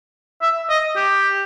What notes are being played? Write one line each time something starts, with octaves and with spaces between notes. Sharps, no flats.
E5
D#5
G4